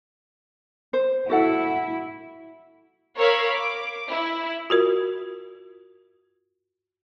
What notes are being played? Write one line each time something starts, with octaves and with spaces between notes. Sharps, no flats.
C5
E4 F#4 A4 F#5
A#4 C#5 F5 B5 E6
D6
E4
F4 F#4 A#4